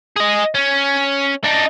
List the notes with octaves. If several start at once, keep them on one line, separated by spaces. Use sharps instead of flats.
G#4 D#5
C#4
D4 D#4